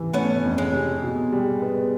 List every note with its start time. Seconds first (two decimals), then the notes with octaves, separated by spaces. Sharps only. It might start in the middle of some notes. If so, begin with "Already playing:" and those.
Already playing: C3 E3
0.13 A3 B3 C#4
0.44 F2
0.58 G#3
0.72 C3
1.03 B2
1.32 G3
1.62 B3